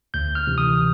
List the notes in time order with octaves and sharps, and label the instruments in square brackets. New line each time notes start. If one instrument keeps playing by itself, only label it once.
[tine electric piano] D2 G6
F6
C3 E3
D#6